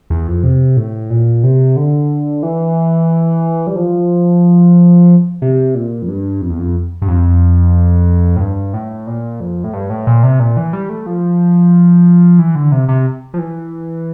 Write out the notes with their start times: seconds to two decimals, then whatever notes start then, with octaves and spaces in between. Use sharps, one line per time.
0.10 E2
0.27 F2
0.44 C3
0.77 A2
1.10 A#2
1.44 C3
1.77 D3
2.43 E3
3.67 G3
3.76 F3
5.42 C3
5.75 A#2
6.02 F2
6.08 G2
6.41 F2
6.50 E2
6.59 F2
7.02 G2
7.08 F2
8.36 A2
8.40 G2
8.74 A2
9.07 A#2
9.40 F2
9.64 A2
9.73 G2
9.90 A2
10.07 A#2
10.23 C3
10.40 A#2
10.57 E3
10.73 G3
10.89 A3
11.06 F3
12.39 E3
12.55 D3
12.72 C3
12.89 C3
13.34 F3
13.39 E3